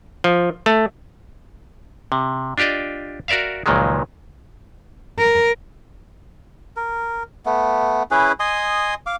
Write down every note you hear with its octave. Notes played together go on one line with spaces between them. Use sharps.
F3
A3
C3
D4 F4 G4 D5 D#5
F#4 A#4 D5 E5 F5
C#2 A#2 D#3 F3 F#3 G#3
A#4
A#4
A3 B3
C#4 E4 G#4 B4
D#5 G#5 C6 D#6
F5 D6